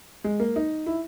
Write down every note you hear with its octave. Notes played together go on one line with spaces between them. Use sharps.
G#3
A#3
D#4
E4